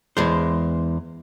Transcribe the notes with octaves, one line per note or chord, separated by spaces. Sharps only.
E2 G#3 C5